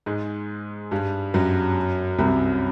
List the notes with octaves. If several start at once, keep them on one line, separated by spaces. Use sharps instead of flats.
G#2 G#3
G2 G3
F#2 F#3
C2 C3